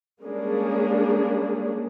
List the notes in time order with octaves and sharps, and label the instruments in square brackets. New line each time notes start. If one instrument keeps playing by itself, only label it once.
[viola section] G3 G#3 A#3 C#4 D4 G#4